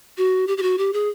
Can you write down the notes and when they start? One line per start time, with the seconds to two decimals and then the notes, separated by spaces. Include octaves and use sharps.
0.17 F#4
0.47 G4
0.57 G4
0.62 F#4
0.78 G4
0.93 G#4